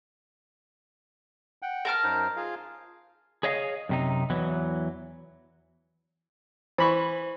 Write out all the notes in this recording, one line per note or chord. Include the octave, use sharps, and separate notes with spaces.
F#5 G5
A#4 A5 F6
F#2 D#4 C5
F4 G#4 F5
G#4 C#5 D#5 F5
F#2 C3 D#4
E2 E3 F#3
E3 C5 B5 C#6